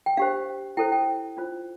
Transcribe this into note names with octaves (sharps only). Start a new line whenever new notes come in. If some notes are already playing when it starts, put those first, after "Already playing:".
G5
D4 G4 C5 F5
E4 A4 C5 G5
G5
D4 F4 C5